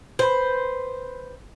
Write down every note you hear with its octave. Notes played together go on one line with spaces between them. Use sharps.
B4 C5